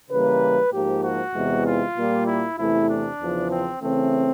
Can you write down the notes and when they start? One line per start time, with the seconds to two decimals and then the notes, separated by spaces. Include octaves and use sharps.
0.11 C#3 E3 G3 A#3 B4
0.73 G#2 F3 A#3 G4
1.03 F#4
1.35 E2 C3 E3 G#3 B3
1.65 F4
1.97 A#2 G3 A#3
2.27 E4
2.58 E2 C3 E3 A3 E4
2.90 D4
3.20 E2 C#3 F3
3.51 C4
3.82 C#3 E3 A3 C4